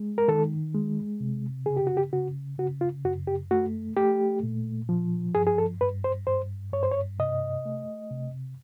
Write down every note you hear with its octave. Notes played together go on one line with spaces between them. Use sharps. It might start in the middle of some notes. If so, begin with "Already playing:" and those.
Already playing: G#3
A#4
D#3 A4
G#3
C3
C#3 G#4
G4
F#4
G4
C#3 F#4
C#3 F#4
F4
F#2 F#4
G4
A3 F#4
A3 G4
A#2
F3
G2 G#4
G#4
A4
G2 B4
C5
G2 C5
G2 C#5
C5
C#5
C3 D#5
A3
C3